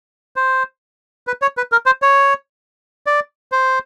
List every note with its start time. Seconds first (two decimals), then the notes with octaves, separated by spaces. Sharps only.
0.36 C5
1.27 B4
1.42 C#5
1.57 B4
1.72 A#4
1.86 C5
2.02 C#5
3.06 D5
3.52 C5